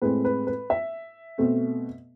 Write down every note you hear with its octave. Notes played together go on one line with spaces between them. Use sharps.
A2 G#3 C4 B4
B4
B4
E5
B2 A3 C4